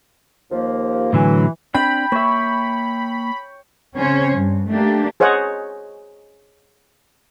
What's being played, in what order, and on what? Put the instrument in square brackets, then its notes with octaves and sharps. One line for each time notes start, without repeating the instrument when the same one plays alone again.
[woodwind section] D#2 F3 A#3
[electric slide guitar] A2 D3 F#3 [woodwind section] E3
[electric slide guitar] C4 D4 D5 [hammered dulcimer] G5 [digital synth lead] B5
[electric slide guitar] A#3 E5 [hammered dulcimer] C#5
[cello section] C#3 C4 C#4 C5 C#5
G2
A3 A#3 D4 G4
[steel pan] G#4 C5 C#5 D#5 F#5